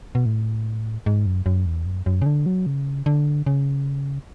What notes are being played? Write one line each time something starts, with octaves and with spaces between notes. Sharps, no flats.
B2
A2
G#2
F#2
F#2
E2
F#2
F#2
C#3
D3
F#3
C#3
D3
C#3